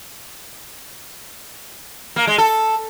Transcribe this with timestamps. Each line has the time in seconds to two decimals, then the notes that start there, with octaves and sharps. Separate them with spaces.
2.16 A#3
2.27 G#3
2.38 A4